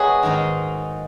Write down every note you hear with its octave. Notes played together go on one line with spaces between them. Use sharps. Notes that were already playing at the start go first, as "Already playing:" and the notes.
Already playing: A#3 D#4 F#4 G#4 B4 C#5
G#2 D#3 G#3 D#4